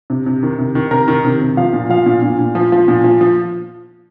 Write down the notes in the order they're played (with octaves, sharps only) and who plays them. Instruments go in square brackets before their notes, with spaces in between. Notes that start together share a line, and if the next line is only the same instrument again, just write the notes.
[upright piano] C3
C3
D#3
C3
D#3
C3 A#4
D#3
C3
C3
F3 F5
A#2
F3 F5
A#2
A#2
A#2
F3
F3
A#2
F3
F3